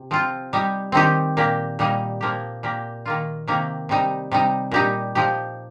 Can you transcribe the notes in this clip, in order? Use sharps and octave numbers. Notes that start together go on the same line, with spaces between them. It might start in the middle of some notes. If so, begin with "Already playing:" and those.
Already playing: C3
F3 C4 F4
G3 D#4 G4
D#3 C4 D#4 G4
A#2 A#3 G4
A#2 G3 A#3 D#4
F3 A#3 G4
A#2 A#3 G4
D#3 A#3 F4
C3 D#3 A#3 G4
C3 G3 D#4
C3 G3 D#4
A#2 G3 D#4 G4
F3 D#4 G4